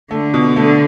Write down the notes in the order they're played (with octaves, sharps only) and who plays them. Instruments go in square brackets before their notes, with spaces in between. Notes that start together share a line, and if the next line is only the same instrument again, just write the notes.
[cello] D3 [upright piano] A3
[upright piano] B2
[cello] D3 [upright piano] A3